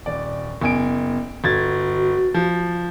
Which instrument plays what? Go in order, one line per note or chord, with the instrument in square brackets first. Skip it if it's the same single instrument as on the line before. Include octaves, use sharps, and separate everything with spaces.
[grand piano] D#1 D5
[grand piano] F#1 G#5 D7 [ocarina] B3
[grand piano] G1 G#6 A6 [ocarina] F#4
[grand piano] F3